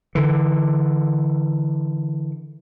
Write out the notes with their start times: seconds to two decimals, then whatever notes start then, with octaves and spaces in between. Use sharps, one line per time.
0.15 D3 E3